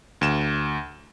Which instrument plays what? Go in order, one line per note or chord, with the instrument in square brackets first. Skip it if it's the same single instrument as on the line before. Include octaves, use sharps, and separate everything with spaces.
[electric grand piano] D2 E7